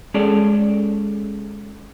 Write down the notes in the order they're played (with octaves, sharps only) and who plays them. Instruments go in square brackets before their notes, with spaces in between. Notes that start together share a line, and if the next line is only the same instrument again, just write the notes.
[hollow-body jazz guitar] G#3 C#4 G#4 A4 C#5 D5